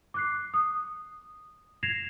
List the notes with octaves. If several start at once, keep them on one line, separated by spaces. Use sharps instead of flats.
D6 F#6 C7
D#6
G#6 A#6 C7 E7 F7